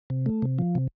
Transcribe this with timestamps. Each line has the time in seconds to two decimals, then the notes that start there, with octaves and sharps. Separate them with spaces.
0.10 C3
0.26 A3
0.42 C3
0.59 F3
0.75 C3